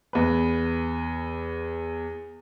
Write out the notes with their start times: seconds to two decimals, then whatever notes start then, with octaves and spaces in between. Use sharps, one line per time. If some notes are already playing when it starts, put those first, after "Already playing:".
0.13 E2 B4